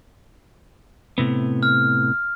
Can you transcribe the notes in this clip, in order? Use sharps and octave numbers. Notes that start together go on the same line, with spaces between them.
A2 C3 B3
F6